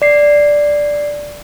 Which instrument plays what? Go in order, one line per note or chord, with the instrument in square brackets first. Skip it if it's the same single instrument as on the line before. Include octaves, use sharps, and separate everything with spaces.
[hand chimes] D5 C7